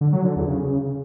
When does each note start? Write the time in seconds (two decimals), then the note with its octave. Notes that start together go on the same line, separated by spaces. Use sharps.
0.01 D3
0.13 F#3
0.24 D3
0.36 E2
0.48 C#3